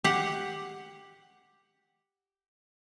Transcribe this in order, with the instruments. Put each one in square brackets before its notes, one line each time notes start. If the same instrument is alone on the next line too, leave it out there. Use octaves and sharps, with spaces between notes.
[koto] G4 F#5